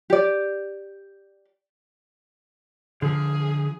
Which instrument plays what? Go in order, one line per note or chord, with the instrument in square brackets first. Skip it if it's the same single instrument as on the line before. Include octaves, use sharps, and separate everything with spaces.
[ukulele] G4 D5
[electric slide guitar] D3 F3 [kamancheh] G#4